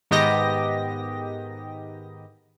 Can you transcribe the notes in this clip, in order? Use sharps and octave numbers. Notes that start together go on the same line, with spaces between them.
G#2 D#3 B3 G4 D#5 A#6